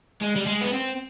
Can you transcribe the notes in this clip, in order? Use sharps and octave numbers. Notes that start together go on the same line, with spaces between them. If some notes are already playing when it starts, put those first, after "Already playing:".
G#3
G3
G#3
B3
C4